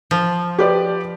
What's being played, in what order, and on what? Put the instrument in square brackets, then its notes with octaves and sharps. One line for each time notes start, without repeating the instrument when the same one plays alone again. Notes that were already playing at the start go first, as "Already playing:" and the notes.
[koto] F3
[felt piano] G4 B4 D5